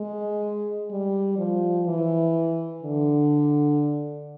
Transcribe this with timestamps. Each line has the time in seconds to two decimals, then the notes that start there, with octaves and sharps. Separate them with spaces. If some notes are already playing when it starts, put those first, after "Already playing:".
Already playing: G#3
0.90 G3
1.38 F3
1.86 E3
2.83 D3